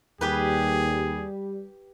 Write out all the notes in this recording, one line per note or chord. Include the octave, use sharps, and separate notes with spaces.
D#2 G3 G4 G#4 B4